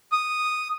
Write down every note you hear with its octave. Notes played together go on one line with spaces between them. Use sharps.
D#6